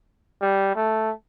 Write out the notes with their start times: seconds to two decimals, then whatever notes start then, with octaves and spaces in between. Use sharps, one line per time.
0.41 G3
0.75 A3